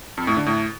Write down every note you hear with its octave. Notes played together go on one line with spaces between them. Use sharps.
F2
A2
D3
A2